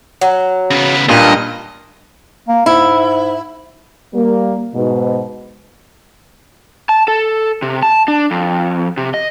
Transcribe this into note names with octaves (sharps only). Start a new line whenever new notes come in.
F#3
C#3 B3
G2 A#2 D#5
A#3
G#2 E4
G3 A#3
G#2 B2
A5
A4
C3
A5
D4
F2
C3
D#5